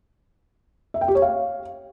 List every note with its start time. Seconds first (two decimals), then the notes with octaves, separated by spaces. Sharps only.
0.94 E5
1.01 G5
1.08 G4
1.15 C#5
1.22 F5